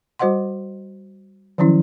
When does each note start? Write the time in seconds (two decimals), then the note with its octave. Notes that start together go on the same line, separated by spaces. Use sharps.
0.19 G3 F#4 C5 D#5 F#5 C6
1.58 D#3 F3 F#3 C#4 E4